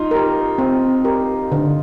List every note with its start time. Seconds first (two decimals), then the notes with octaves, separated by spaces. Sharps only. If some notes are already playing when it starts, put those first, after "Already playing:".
Already playing: D#4 F4
0.11 G4 A#4
0.58 C4
1.05 G4 A#4
1.52 D3